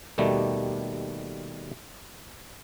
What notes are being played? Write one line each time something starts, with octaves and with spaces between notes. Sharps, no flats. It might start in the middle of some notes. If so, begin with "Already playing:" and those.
D#2 B2 D#3 G3 A3